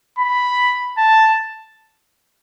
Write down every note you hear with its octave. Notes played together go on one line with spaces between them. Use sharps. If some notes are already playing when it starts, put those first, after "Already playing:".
B5
A5